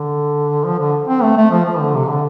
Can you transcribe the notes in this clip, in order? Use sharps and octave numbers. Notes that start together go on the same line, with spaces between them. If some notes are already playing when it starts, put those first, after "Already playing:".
Already playing: D3
F3
D3
C4
A3
A3
F3
F3
D3
C3
D3